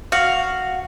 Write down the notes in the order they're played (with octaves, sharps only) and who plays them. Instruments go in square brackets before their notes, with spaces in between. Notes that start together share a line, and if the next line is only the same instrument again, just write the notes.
[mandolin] F#4 F5